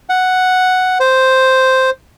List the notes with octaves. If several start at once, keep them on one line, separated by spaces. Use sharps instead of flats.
F#5
C5